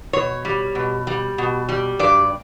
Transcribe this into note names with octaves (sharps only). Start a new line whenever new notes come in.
B2 C#5
G3
B2
G3
B2
G3
G2 D5